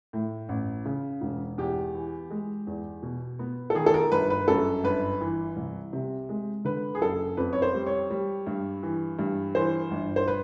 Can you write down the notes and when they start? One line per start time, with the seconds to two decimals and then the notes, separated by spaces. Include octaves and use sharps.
0.13 A2
0.49 A1
0.85 C#3
1.21 E1
1.58 E2 G4
1.94 E3
2.30 G#3
2.67 E2
3.02 B2
3.39 B3
3.70 A4
3.75 D#3 G#4
3.86 A4
3.94 A#4
4.11 G1 B4
4.30 B4
4.48 F#2 A4
4.83 G1 B4
5.21 E3
5.56 C2
5.93 C3
6.29 G#3
6.65 D3 B4
6.95 G#4
7.01 F#1 A4
7.37 F2 B4
7.53 C#5
7.62 C5
7.74 G3
7.87 C#5
8.10 G3
8.47 G2
8.83 E3
9.19 G2
9.55 E3 C5
9.91 G1
10.16 C5
10.28 B4